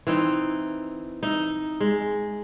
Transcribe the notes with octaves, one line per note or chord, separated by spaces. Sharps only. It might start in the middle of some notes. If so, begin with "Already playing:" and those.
E3 C4 D#4
D#4 E5
G#3